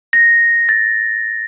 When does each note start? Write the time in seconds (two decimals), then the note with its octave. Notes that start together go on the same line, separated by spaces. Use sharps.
0.13 A#6
0.69 A6